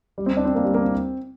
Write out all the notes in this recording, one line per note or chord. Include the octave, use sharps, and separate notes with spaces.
G3
C4
D4
C4
A#3
G3
A#3
C4